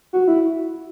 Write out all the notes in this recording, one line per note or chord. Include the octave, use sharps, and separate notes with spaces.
F#4
E4